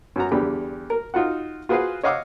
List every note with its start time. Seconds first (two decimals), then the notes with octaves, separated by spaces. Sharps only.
0.16 F#2 F#4 A#5
0.32 E2 D3 G3 G4 B5
0.90 A#4
1.14 D#4 F4 F#4 F#5
1.69 F4 F#4 G#4 B4 C5 F5
2.03 C#5 D#5 F5 F#5 D6 E6